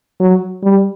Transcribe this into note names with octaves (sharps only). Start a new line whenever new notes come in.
F#3
G3